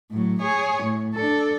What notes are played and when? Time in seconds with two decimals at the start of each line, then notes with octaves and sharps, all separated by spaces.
0.11 A2 F#3
0.41 G#4 C#5
0.83 A2
1.15 D4 A4